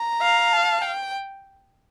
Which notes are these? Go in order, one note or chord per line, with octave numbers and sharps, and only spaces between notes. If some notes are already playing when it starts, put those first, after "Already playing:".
Already playing: A#5
F5
A5
G5